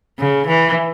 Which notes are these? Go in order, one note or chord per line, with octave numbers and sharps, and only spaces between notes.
C#3
E3